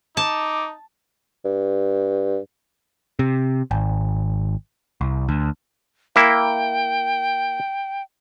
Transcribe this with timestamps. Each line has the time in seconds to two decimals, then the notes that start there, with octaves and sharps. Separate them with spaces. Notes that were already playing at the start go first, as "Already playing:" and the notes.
0.17 D#4 A5 D6
1.45 G2
3.19 C3
3.71 G#1
5.01 C2
5.28 D2
6.16 A#3 E4 G5